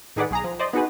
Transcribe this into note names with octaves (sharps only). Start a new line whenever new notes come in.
A2 D#3 G#4 B4 D5 F#5
B1 G#4 A#5
F3
C5 D5 D#5
B3 D#4 F#4 G#4 B4